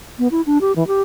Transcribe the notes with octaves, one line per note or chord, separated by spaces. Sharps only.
B3
E4
D4
G4
E3
G4